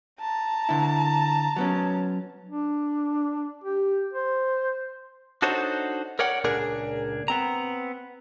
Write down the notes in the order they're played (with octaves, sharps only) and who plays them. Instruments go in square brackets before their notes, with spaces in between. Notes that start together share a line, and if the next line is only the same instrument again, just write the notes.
[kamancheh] A5 A#5
[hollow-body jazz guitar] D3 E4
F#3 B3 C#4
[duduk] D4
G4
C5
[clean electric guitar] D4 D#4 F#4 A4 C5 C#5
A#4 C#5 D5 F#5 G5
C#2 A#2 D4 G#4 A#4
B3 C4 A#5